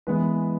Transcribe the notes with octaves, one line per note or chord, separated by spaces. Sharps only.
E3 G#3 B3 B4